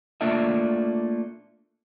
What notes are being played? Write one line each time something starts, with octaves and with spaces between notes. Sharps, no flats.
A3 A#3 D4 F4 D5 E5